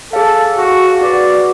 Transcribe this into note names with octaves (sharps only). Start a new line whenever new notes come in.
G#4 A4 C#5 F5
F#4
F#4 B4 D5 F#5